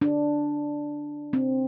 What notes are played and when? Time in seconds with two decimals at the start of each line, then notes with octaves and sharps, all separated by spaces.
0.02 D4
1.33 C4